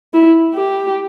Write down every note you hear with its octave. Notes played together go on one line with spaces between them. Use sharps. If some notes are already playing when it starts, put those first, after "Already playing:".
E4
G4